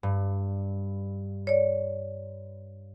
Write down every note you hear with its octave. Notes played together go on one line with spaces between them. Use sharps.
G2
C#5 D5